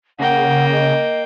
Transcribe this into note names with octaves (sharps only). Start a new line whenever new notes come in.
C#3 A#3 F#5 G5
D#5